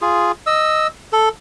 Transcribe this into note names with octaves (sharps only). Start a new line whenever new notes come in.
F4 G#4
D#5 E6
A4